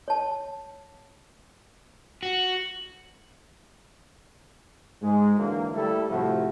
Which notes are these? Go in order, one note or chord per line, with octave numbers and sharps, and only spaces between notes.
C#5 A5
F#4
G#2 G#3
D3 E3 F#3 A#3
G3 A3 E4 A4
A2 C3 F3 A3 E4 F#4